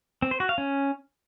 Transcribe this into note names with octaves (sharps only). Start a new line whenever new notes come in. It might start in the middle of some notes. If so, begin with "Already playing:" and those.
C4
C5
F#4
F5
C#4